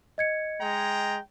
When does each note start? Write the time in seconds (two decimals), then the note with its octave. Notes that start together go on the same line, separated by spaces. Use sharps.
0.18 D#5 G#6 C#7
0.61 G#3 G5 A#5